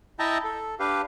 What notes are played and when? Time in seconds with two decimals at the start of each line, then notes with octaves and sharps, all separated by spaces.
0.19 E4 D#5 E5 G5 A5 A#5
0.44 A4
0.80 D4 G4 B4 F5